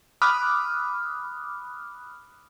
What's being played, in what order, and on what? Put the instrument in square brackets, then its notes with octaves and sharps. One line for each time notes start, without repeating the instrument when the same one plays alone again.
[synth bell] B5 D6 D#6 F6 F#6